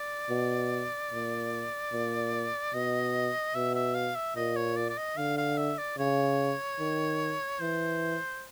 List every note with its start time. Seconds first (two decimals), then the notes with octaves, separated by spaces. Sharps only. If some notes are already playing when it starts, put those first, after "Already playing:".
Already playing: D5
0.30 B2
1.11 A#2
1.92 A#2
2.74 B2 D#5
3.54 B2 E5
3.75 E5
3.95 F5
4.15 E5
4.36 A#2 D#5
4.56 C#5
4.77 D5
4.89 D5
4.97 D#5
5.17 D3 F5
5.37 F5
5.58 E5
5.78 D5
5.98 C#3 C#5
6.79 D#3
7.61 E3 C5